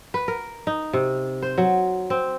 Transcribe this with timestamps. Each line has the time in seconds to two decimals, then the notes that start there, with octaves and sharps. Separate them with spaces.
0.14 B4
0.28 A#4
0.67 D#4
0.93 C3
1.42 C5
1.58 F#3
2.10 C4